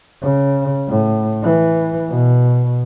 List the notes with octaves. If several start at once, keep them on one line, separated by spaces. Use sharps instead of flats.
C#3
A2
E3
B2